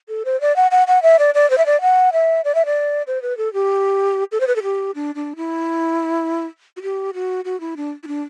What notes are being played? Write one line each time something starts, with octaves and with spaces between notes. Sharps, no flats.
A4
C5
D5
F#5
F#5
F#5
E5
D5
D5
C5
E5
D5
F#5
E5
D5
E5
D5
C5
B4
A4
G4
A4
C5
B4
A4
G4
D4
D4
E4
F#4
G4
F#4
F#4
E4
D4
E4
D4